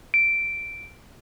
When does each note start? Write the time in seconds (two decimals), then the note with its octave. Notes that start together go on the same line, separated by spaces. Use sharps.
0.14 D7